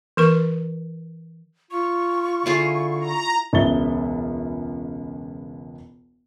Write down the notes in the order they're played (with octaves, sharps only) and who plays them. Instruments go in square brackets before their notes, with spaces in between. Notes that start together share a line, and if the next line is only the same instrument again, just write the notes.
[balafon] E3 A#4 C#6
[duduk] F4 [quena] C#6
[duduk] D3 [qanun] E4 F4 G#4
[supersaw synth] A#5
[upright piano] E1 C#2 E5 A6 G7